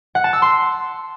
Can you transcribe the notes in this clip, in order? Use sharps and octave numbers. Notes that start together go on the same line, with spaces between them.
F#5
A5
E6
C6